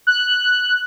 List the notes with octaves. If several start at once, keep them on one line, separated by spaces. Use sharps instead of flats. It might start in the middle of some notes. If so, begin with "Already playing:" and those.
F#6